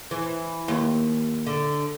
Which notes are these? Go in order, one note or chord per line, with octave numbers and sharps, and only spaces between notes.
E3
D#2
D3